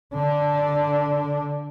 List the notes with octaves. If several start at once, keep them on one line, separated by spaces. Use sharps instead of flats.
D3 D4